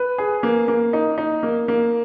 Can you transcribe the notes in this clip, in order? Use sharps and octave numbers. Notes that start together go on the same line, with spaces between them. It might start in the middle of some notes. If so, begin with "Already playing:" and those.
Already playing: B4
G#4
A#3
A#3
D#4
D#4
A#3
A#3